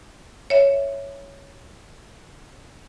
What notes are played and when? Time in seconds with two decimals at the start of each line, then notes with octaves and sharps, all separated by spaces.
0.50 C#5 E5